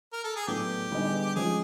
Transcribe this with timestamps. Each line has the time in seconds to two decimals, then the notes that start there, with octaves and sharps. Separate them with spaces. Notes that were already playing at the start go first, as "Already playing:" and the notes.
0.13 A#4
0.24 A4
0.36 G#4
0.47 A2 F#3 B3 D4 G4
0.92 D3 G3 B3 D#4 G#4
1.36 F3 G#3 C#4 F4 G#4